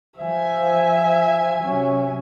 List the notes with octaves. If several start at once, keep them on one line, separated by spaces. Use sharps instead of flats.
F3 E5 G#5
C3 F#3 C#4